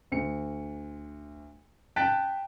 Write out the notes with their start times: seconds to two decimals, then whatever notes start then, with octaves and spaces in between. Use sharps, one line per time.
0.12 D2 C#7
1.96 G5 A5 F#6 A6 B6 D7